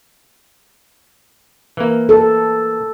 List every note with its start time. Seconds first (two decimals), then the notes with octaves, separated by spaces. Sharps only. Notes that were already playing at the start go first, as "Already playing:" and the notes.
1.77 E3 A#3
2.09 A4